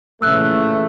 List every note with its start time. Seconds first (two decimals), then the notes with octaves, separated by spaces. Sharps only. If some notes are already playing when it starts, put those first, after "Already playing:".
0.22 A#2 C#3 E3 A3 E6 F#6